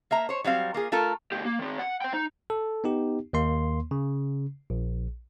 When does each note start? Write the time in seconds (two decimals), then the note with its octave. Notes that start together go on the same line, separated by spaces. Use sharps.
0.11 A#3 E5 A#5
0.29 C5 C#5
0.44 F#3 G3 C4 F5
0.74 A#3 F4 G#4
0.92 A3 F4 A4 A#4
1.32 D2 G4
1.45 A#3
1.59 D#3 C4
1.79 F#5
2.02 C5 G5
2.13 D#4
2.50 A4
2.84 B3 D#4 G4
3.33 D#2 A#3 C6
3.91 C#3
4.70 A#1